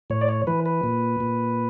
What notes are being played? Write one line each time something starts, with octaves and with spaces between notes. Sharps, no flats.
A2 C#5
D5
C#5
E3 B4
B4
A#2
A#2